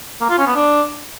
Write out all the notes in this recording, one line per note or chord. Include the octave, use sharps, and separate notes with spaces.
A#3
F4
C#4
B3
D4